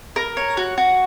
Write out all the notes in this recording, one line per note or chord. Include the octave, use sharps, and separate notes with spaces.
A#4
C#5
F#4
F#4